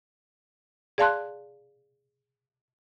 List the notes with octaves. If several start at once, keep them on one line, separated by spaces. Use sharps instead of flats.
G#4 D5 F5 A5 C6 F#6